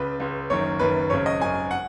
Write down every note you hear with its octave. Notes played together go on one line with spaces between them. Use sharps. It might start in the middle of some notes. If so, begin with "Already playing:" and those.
Already playing: C#2 C#3 B4
C#2 C#3
F#1 F#2 D#3 C#5
F#1 F#2 D#3 B4
G#1 F#2 C#3 C#5
D#5
G#1 F#2 C#3 G#5
F#5